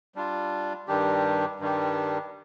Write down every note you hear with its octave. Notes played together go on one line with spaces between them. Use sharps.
G3 D4 F4
G2 D#3 G3 D4 G4
G2 D#3 G3 D4 G4